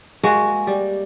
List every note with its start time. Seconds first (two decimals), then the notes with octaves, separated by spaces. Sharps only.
0.23 G#3 A#3 F#4
0.67 G3